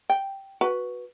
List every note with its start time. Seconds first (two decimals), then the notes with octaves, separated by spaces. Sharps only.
0.10 G5
0.61 F#4 B4